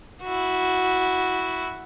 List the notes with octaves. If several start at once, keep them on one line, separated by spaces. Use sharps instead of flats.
E4 F#4